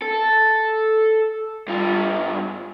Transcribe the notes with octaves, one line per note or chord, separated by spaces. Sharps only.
A4
G2 F4